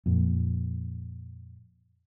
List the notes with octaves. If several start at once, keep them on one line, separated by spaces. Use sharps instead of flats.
F2 A#2